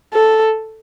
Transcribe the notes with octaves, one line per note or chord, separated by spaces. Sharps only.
A4